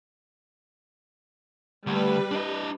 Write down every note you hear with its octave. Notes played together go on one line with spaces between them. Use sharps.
D3 G3 A3 B4
D4 D#5